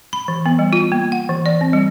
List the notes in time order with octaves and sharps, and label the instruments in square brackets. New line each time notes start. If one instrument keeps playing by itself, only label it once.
[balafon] B5
E3
B3
G3
F4
A#3
F#5
E3
D5
C4
G3